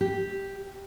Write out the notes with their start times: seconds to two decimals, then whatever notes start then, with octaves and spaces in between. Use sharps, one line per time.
0.01 G4